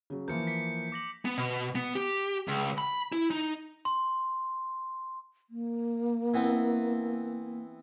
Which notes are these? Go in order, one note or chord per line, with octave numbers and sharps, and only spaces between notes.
C#3 F#3
E3 F3 A#3 G6 C#7
B6 C#7
D6 A#6 F#7
B3
B2
B3
G4
C#2
B5
E4
D#4
C6
A#3
E3 B3 C4